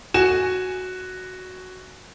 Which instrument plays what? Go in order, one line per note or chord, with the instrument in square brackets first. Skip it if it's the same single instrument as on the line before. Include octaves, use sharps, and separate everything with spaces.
[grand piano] F#4 G#5 E7